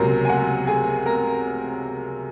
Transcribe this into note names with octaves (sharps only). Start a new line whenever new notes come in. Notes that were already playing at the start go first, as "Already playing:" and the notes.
Already playing: C#2 C3 F#3 A#3 A#4 A#5
G#5
F#4 F#5
G#4 G#5
A#4 A#5